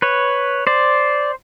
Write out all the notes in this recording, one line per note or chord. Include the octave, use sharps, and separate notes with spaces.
B4 C#5
C5 D5